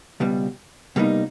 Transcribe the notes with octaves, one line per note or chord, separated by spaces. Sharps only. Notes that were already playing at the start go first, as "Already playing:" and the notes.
C#2 B2 G3
C2 B2 G3 A#3 D#4